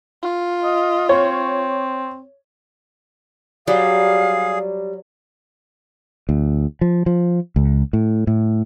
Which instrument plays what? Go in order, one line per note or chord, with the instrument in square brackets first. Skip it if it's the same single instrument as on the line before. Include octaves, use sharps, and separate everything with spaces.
[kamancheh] F4
[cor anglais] D#5
[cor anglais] C4 [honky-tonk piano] C#5
[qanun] F#3 [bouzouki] G3 [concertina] G#4 [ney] F5
[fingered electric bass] D2
F3
F3
C#2
A2
A2